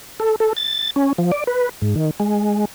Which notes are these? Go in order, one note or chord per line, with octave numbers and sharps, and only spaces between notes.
A4
A4
A6
C#4
F3
D5
B4
G#2
D#3
G#3